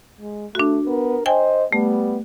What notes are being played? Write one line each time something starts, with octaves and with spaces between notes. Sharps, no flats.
G#3
A3 D4 F#4
B3 A#4
C5 D#5 G5 G#5
G3 A3 B3